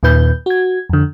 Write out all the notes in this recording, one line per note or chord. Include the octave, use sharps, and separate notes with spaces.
D#2 A#2 D#3 B4 G6
F#4 G#6
F2 D3